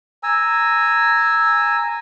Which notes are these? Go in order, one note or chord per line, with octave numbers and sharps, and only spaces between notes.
G#5 A#5 E6